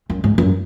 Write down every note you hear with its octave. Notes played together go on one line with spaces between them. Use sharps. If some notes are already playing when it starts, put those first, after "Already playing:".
F#2
G#2
F#2